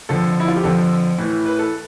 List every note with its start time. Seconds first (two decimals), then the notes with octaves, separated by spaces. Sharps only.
0.09 F2 D3 F3 A4
0.40 E4
0.48 F4
0.56 G4
0.63 F2 D3 F3 A4
1.18 A2 E3
1.46 B4
1.59 A4